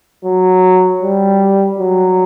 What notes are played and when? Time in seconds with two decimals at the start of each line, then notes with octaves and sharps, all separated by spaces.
0.25 F#3
1.02 G3
1.79 F#3